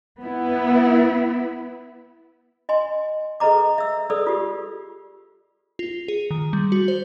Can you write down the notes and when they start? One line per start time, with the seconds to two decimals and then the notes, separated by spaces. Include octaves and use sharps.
0.20 B3 E4
2.69 D#5 G#5 C6
3.40 G#4 A4 B4 D#5 A#5 D6
3.78 E5 E6
4.10 G#4 A4 B4 D5 D#6 E6
4.27 F4 G4
5.79 F4
6.08 G#4
6.31 D#3
6.53 G3
6.72 F#4
6.88 C5